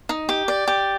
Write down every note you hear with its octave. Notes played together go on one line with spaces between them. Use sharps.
D#4
G4
D5
G4